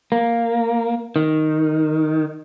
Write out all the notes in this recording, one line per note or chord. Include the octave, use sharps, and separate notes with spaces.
A#3
D#3